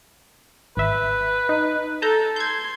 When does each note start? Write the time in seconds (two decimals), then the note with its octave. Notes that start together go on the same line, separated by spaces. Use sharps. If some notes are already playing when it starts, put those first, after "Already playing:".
0.77 G#1 B4 E5
1.49 D#4
2.02 A4 A5 A#5 G6
2.36 C6 G6 G#6